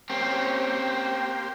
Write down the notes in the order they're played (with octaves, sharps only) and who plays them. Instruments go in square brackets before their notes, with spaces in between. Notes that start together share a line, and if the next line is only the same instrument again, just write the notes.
[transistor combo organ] A#3 G4 C5 [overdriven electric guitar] C4 C#4